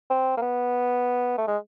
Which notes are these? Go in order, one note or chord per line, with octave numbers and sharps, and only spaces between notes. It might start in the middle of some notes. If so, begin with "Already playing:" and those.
C4
A#3
B3
A3
G#3